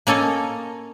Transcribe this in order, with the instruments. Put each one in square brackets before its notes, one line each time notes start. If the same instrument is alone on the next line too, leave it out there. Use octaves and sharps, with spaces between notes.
[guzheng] A#3 C#4 A4 C#5 D#5